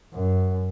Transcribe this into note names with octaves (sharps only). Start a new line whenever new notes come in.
F#2